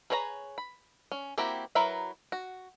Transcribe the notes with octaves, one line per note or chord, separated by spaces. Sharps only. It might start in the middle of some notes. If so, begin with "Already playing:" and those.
G#4 B4 C#5 D#5 A#5
B5
C#4
A#3 C4 E4 F#4 G4
F#3 E4 A#4 B4 E5
F#4